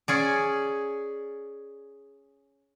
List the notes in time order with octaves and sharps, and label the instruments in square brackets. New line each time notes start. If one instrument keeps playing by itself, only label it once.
[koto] C#4 G#4 D5